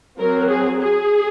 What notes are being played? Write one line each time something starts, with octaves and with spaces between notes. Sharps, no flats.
F#3 C4 A#4
G#4
G#4